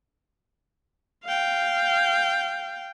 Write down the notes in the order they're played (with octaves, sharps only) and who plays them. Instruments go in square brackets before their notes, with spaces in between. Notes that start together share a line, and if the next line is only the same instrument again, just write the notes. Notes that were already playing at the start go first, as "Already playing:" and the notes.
[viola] F5 G5